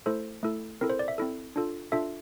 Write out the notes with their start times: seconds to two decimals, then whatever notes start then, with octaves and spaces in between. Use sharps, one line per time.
0.06 A3 E4 A4 C5
0.43 A3 E4 A4
0.81 C4 E4 A4 A#4
0.90 C5
0.99 D5
1.08 E5
1.18 C4 E4 A4
1.56 D4 F4 A4
1.92 D4 F4 A4 E5